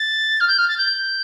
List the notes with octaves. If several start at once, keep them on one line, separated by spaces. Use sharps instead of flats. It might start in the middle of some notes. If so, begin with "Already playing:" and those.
Already playing: A6
F6
G6
F6
A6
G6